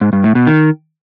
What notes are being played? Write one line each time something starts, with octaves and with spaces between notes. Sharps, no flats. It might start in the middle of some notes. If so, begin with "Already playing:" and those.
G#2
G2
A2
B2
D#3